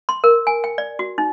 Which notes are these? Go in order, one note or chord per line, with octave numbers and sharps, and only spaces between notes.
C6
A#4
G#5
G5
D5
F#4
D#4